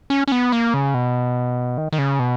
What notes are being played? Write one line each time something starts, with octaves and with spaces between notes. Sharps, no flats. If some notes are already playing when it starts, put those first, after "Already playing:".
C#4
C#4
B3
A#3
C#3
B2
D#3
D#3
C#3
B2